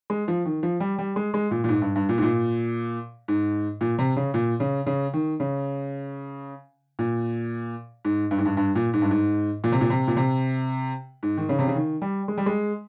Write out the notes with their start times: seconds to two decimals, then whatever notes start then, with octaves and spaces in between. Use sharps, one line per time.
0.10 G#3
0.28 F3
0.45 D#3
0.63 F3
0.80 G3
0.98 G3
1.16 G#3
1.34 G#3
1.51 A#2
1.64 A#2
1.69 G#2
1.82 G2
1.96 G2
2.09 A#2
2.18 G#2
2.22 A#2
3.28 G#2
3.81 A#2
3.98 C3
4.16 C#3
4.34 A#2
4.60 C#3
4.86 C#3
5.13 D#3
5.40 C#3
6.99 A#2
8.05 G#2
8.31 G2
8.38 G#2
8.45 G2
8.57 G2
8.75 A#2
8.94 G#2
9.02 G2
9.11 G#2
9.64 A#2
9.72 C3
9.81 A#2
9.90 C3
10.07 A#2
10.17 C3
11.23 G#2
11.37 D#3
11.49 C#3
11.59 C3
11.68 C#3
11.75 D#3
12.02 G3
12.28 G#3
12.38 G3
12.46 G#3